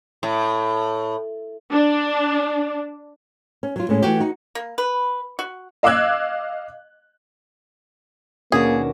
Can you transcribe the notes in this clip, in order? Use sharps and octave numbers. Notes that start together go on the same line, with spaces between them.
A2
D4
C#4
F#3 F4
A2 G#3 C#4
E3 A3 F#4 G4
D#4 F#4
A#3
B4
F#4
D#5 F5 D6 E6 F#6 G#6
D#2 B2 A#3 C#4 D4 F#4 G#4